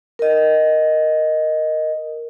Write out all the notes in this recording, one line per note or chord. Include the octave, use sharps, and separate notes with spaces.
A#4 D#5